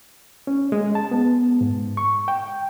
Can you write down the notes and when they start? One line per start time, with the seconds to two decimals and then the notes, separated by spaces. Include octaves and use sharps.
0.47 C#4
0.72 G#3
0.95 A5
1.11 B3
1.61 G#2
1.97 C#6
2.28 G5